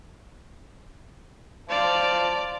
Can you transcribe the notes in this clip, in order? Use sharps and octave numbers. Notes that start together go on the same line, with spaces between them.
C5 D5 F5 A5